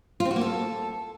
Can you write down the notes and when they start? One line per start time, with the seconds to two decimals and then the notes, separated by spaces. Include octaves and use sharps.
0.20 F4
0.25 C4
0.31 F#4
0.36 A#3
0.41 A4